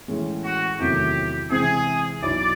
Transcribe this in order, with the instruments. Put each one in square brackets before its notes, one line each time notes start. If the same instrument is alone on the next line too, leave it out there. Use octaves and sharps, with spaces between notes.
[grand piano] A2 E3 G#3 C#4
[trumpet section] F#4
[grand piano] E2 C3 D#3 F#3 A3 [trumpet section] G4
[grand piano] C3 E3 G#3 C4 [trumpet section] G#4
[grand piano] B1 B2 F#3 B3 E4 [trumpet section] D5